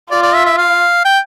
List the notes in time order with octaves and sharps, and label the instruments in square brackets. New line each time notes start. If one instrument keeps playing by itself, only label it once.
[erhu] F4 [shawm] D5
[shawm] D5
E5
E5
F5
G5